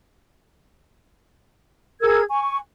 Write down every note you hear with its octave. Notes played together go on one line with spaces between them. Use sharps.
G#4 A#4 E6 G#6
G#5 C#6